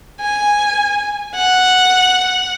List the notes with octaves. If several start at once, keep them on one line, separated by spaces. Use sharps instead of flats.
G#5
F#5